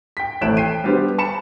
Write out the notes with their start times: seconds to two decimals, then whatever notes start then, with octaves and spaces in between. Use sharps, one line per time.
0.17 G5 B6
0.41 A1 A3 C4 F#6 D7 E7
0.57 G5 C7 D#7
0.84 G3 B3 D4 G4 B4 C5
1.18 A5 B5 C#7 E7